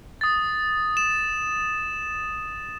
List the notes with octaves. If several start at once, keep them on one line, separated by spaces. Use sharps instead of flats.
D#6 A6
E7